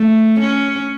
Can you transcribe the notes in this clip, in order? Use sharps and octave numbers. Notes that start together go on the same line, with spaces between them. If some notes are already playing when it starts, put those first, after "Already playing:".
Already playing: A3
C#4